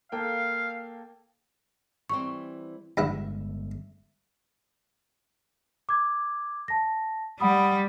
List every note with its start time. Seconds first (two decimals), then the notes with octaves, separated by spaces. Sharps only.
0.12 A#3 A4 F5 G5
2.09 E3 G3 C4 C#6
2.97 G1 G2 D3 G#3 E4 E5 F#5
5.89 D6 G#6
6.68 A5 A#6
7.40 G3 F#5 B5 D#6